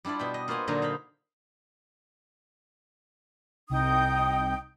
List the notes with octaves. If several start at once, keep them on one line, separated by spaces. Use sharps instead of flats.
G3 D4 E4 F4 D5
B2 E5 G5
D#5
A#3 F4 B4 C5 F#5 G#5
A#2 D3 F#3 D#4 F4
C5 F5 B5
C2 D#4 G5 D#6 G6